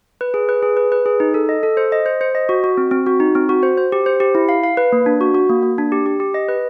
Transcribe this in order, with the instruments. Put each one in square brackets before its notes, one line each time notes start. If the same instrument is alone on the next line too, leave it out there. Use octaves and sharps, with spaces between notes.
[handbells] B4
G#4
B4
G#4
B4
B4
G#4
D#4
A4
D#5
A4
C5
D#5
C5
C5
D#5
F#4
F#4
C4
C4
F#4
D#4
C4
F#4
C5
C5
G4
C5
G4
E4
F5
F5
B4
A#3
D4
F#4
F#4
A#3
A#3
D4
G4
G4
G4
D#5
B4